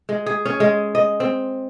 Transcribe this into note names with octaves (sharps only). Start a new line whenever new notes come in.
G#3
G#4
C#4
G#3
D#5
C4